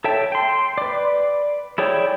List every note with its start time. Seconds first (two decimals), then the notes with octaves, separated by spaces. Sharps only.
0.04 A4 C#5 E5 G5 A5
0.32 G5 C6
0.78 B4 D5
1.78 E4 G#4 C#5 D5 G5